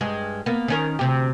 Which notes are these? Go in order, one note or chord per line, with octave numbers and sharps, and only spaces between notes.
G2 G#3
A#3 B3
D#3 C#4 A#4
D2 C3 G4